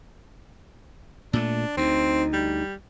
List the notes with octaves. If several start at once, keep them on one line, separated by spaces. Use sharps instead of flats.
A#2 A3 D4
D2 C4 D#4
G3